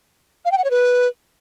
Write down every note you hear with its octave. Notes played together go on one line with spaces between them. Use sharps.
F5
G5
F#5
C#5
B4